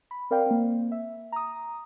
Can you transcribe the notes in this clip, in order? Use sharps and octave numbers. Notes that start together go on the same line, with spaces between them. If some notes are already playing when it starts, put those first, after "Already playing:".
B5
C4 A#4 D5 F5 G5
A#3 C4
E5
A#5 D#6